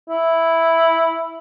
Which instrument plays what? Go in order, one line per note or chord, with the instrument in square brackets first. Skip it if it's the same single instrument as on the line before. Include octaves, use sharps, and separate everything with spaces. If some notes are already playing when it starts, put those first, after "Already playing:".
[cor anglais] E4